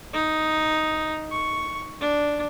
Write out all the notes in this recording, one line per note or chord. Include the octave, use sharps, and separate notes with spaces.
D#4
C#6
D4